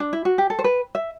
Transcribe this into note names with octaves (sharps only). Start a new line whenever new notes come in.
D4
E4
F#4
G4
A4
C5
B4
E5